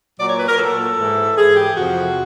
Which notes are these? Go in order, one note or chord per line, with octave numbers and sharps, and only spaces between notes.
A#2 F#3 D5
C#5
B4
A#4
A#2 F#3 A4
G#2 E3
G#2 E3 G#4
G4
F2 C3 F3 F#4